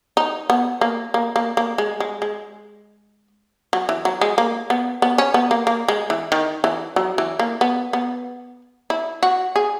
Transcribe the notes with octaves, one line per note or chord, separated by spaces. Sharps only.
D#4
B3
A#3
A#3
A#3
A#3
G#3
G#3
G#3
F#3
E3
F#3
G#3
A#3
B3
B3
C#4
B3
A#3
A#3
G#3
E3
D#3
E3
F#3
E3
A#3
B3
B3
E4
F#4
G#4